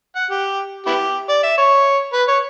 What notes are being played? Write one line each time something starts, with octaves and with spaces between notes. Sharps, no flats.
F#5
G4
B3 E4 G4
D5
E5
C#5
B4
C#5